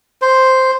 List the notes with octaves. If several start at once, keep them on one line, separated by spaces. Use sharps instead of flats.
C5